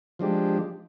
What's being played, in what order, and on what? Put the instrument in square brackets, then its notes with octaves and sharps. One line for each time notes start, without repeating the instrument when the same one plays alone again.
[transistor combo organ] F3 G#3 D4 G4